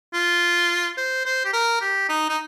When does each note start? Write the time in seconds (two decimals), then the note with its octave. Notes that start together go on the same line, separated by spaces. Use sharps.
0.14 F4
0.97 C5
1.25 C5
1.45 G4
1.53 A#4
1.81 G4
2.09 D#4
2.29 D#4